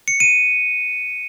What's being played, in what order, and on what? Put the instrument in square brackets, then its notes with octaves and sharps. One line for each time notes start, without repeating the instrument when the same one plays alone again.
[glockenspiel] C#7
D#7